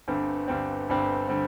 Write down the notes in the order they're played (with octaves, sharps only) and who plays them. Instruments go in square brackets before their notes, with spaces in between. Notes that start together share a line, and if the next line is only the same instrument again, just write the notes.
[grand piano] G1 G2 D3 G3 C4
G1 G2 D3 G3 C4
G1 G2 D3 G3 C4
D3 G3 C4